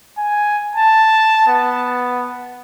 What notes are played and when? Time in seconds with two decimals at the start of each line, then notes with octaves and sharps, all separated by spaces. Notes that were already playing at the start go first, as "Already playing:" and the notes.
0.18 G#5
0.76 A5
1.48 B3